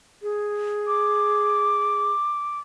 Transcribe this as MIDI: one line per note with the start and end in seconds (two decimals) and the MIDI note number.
0.22 2.12 68
0.87 2.59 86